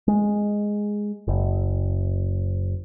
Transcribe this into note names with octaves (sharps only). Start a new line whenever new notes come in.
G#3
F#1